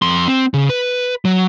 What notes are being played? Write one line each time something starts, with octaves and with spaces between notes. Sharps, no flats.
F2 C6
C4
C#3
B4
F#3